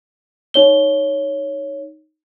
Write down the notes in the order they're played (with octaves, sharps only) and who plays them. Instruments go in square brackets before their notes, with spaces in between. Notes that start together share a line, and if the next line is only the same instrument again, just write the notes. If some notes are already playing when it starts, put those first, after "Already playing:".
[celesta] D#4 C#5 G7